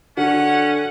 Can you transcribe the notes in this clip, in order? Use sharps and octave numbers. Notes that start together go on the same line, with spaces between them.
D3 C#4 F#4 A4 F#5